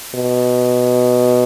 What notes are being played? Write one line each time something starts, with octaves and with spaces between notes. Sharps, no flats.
B2